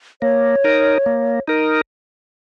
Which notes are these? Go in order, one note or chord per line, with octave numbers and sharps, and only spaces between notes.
A#3 C#5
D#4 A#4
A#3
D#4 A#4